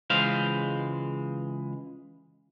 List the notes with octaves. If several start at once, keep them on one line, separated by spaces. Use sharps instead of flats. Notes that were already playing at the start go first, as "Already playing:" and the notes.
C#2 E3 G#3 C5 F5